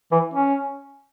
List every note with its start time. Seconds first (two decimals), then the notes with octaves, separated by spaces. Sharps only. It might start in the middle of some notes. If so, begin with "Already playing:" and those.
0.11 E3
0.34 C#4